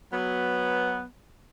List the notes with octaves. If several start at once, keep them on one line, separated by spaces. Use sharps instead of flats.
F#3 B3